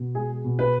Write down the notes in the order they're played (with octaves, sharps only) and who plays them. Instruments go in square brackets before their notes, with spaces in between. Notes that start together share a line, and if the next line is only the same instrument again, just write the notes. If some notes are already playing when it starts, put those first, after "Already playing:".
Already playing: [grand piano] B2
G#3 G#4
B2
B4